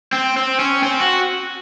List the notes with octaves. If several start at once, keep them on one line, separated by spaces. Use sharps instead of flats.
C4
C4
C#4
C4
F#4